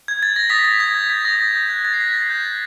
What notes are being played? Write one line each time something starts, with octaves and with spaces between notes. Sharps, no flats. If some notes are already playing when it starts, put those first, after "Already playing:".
G#6
A6
A#6
D#6 B6
D#6 B6
D#6 G#6
G6 A#6
G6 B6
D#6 A#6
G6 A6
G6
A6
F#6 G#6
F#6 A6
C7
F#6 B6
F#6 A6
F#6 G6
F#6